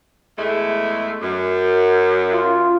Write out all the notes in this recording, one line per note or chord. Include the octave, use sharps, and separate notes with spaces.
E2 G#3 A3
F#2
F4